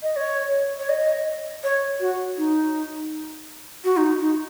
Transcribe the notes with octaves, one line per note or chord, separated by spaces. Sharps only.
D#5
C#5
C#5
D#5
C#5
F#4
D#4
F#4
D#4
D#4